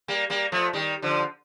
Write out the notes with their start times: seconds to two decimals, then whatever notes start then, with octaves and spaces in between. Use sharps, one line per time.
0.08 G3 A#3
0.30 G3 A#3
0.52 F3 A3
0.73 D#3 G3
1.02 D3 F3